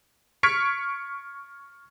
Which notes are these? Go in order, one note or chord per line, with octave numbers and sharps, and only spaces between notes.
C#6 F6 G#6 B6 C#7 D7